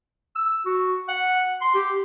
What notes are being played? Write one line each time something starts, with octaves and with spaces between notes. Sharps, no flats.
E6
F#4
F#5
C6
G4